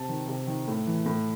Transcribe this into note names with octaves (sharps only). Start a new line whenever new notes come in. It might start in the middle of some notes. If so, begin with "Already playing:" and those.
Already playing: C3 A5
D#3
C3
D#3
A2
E3
A2